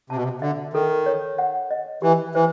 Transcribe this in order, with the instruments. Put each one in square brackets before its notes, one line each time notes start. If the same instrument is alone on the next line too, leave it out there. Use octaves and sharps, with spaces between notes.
[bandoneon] C3 [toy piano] A5
[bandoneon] B2
C3
[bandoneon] D3 [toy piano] E5
[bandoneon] D#3 [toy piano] A4
[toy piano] C#5
F#5
D#5
[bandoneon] E3 [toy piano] G4
[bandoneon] E3 [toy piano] C5